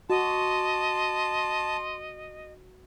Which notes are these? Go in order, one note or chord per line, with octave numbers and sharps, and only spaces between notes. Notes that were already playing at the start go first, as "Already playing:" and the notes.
F#4 D#5 A5 C6